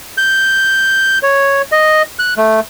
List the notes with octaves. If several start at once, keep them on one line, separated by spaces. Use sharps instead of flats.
G6
C#5
D#5
F#6
A3